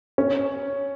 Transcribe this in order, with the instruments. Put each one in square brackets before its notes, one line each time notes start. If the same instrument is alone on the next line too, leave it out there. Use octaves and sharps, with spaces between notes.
[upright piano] C#4